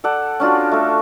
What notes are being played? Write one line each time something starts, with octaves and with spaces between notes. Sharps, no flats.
A4 D5 F#5
C#4 D4 F4 F#4
A3 A4